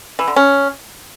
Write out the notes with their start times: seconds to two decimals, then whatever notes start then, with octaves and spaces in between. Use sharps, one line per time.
0.19 E3
0.28 D3
0.36 C#4